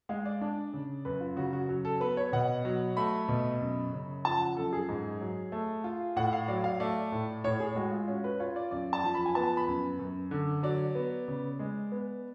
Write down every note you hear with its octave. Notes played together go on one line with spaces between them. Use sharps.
G#3 F5
D5
D4
C#3
F#2 B4
F4
C#3 F#4
F#4
F#3
A4
B3 B4
C#5
B2 F#5
F#3
A3 B5
B2
F#2
C#3
F3 A5
F#5
F#2 A4
G#4
G#2
F#3
A3
F4
A2 F#5
F5
F#3 D5
F5
A3 D5
A2
A2 C#5
G#4
G#3 F#4
F4
C#4 F#4
B4
F4 C#5
D5
F#2 D5
A5
F3
B5
G#5
B3 A5
B5
F#2
F#2
D3
F#3 D5
B3
C#3
G#3
B3